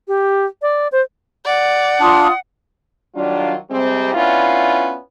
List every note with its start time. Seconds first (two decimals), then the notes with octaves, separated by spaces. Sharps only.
0.08 G4
0.62 D5
0.92 C5
1.46 D5 F#5
2.00 D4 F4 C6 D#6
3.14 D#3 F#3 G3 D4 F4
3.70 C3 G3 G#3 C4
4.13 B3 C#4 D4 E4 F4